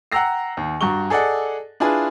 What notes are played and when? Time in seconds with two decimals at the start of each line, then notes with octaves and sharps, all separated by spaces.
0.12 F#5 G5 A#5 E6 A#6 C7
0.57 D#2
0.81 G2 F#4 A#5 C#6 G7
1.10 G#4 A4 D5 D#5 F#5
1.80 D4 E4 F4 G#4 B4